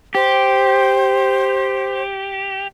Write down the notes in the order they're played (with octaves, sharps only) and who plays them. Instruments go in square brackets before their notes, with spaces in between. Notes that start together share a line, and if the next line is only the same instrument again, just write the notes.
[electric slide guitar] G4 [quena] C5